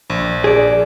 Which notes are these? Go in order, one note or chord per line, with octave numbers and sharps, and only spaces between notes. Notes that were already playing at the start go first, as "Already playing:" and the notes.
A#1
G#4 D5